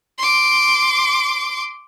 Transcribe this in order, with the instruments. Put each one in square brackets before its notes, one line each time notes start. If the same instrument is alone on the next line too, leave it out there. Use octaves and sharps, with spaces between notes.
[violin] C6 D6